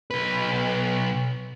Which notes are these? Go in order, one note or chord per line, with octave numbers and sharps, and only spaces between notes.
B1 B4